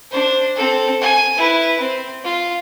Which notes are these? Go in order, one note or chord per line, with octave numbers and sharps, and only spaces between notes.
D4 C5
C4 A4
G#5
E4 B4
C4
F4